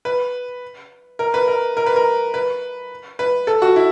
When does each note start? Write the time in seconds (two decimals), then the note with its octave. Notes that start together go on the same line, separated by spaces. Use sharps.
0.05 B4
1.19 A#4
1.34 B4
1.48 A#4
1.77 A#4
1.86 B4
1.96 A#4
2.34 B4
3.19 B4
3.47 A4
3.62 F#4
3.76 E4